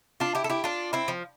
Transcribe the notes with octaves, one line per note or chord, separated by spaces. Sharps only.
D4 F4
E4 G4
A4
E4 G4
D4 F4
C4 E4
F3